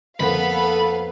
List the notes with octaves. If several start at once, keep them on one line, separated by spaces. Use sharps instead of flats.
F2 A#3 B3 A4 B4 C5 F5 B5